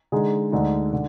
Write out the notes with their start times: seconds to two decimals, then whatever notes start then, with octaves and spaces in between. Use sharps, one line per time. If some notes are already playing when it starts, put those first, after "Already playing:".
0.12 D3 G#3 D#4 G#4
0.52 D2 D3 G#3 D#4
0.93 D3